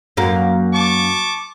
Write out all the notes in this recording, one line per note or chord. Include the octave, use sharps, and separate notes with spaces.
F#2 A#3
A5 C#6 D6